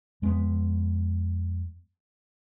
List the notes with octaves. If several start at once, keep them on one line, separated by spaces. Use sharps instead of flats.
F2 G#3 A#3 B3